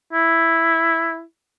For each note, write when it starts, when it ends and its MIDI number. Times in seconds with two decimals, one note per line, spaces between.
0.13 1.22 64